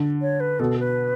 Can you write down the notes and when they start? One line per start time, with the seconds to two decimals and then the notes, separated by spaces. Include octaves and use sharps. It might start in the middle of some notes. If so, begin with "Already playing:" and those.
Already playing: D3
0.22 C#5
0.40 B4
0.60 B2 A4
0.79 B4